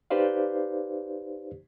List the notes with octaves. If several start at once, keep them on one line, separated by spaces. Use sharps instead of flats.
D#4 G4 B4 C5 D5 F5